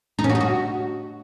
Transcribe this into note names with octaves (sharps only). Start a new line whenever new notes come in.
D#4
C#4
F#4
D#4
F#4